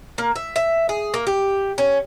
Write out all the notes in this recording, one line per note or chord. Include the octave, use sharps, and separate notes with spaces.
A#3
E5
E5
G#4
A#3
G4
C#4